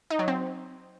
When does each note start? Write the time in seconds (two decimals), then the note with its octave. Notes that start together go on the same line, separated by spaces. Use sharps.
0.10 D#4
0.19 F#3
0.28 C4